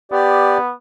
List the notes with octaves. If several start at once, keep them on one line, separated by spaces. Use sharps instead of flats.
B3 G4 D5